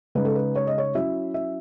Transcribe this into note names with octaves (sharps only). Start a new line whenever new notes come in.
C#3 G#3 D#4 B4
A4
B4
C#5
D#5
C#5
F#3 C#4 E4 E5
E5